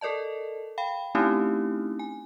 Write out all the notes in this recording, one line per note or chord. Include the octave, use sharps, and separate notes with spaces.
A4 A#4 D5 D#5 A5
F5 G5 B5
A3 C4 C#4 D#4 E4 G4
G#5